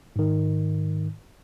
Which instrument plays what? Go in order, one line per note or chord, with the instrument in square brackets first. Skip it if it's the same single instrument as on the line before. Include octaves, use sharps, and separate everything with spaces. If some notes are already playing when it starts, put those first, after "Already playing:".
[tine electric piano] G#2 D#3